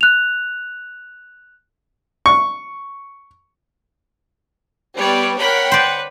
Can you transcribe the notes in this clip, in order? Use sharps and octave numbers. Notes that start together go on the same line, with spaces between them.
F#6 F7
C#6
G3 B3 B4 C#5 D5
A#4 C#5 F#5 G5 B5
B4 C5 D5